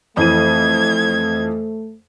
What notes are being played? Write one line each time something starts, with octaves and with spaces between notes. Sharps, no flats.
F2 E3 A3 G#6 D#7